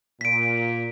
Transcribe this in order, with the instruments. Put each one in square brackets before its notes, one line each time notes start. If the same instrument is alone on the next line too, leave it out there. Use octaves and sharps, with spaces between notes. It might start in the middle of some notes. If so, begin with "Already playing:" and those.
[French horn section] A#2 [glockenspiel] B6 D7